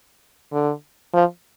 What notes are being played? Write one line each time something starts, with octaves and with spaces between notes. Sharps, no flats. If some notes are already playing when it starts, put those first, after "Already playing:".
D3
F3